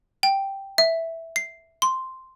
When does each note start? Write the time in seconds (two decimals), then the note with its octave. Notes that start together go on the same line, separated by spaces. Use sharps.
0.23 G5
0.78 E5
1.36 C7
1.82 C6